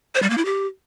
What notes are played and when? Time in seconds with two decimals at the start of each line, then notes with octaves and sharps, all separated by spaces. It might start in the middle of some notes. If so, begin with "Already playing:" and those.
0.15 C5
0.23 G3
0.30 A#3
0.38 E4
0.45 G4